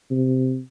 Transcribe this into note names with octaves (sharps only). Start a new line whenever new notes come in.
C3